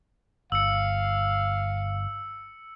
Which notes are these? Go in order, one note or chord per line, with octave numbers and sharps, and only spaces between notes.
G1 F5 E6 C#7